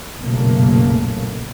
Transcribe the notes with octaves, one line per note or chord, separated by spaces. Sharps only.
F#1 B1 A#2 C#3 A3 A#3